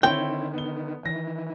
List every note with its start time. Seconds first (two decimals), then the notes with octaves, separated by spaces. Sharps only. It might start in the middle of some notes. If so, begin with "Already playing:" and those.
0.03 D3 D#3 C4 E4 C#5 G5
0.54 B3 G7
1.05 D#3 E3 A#6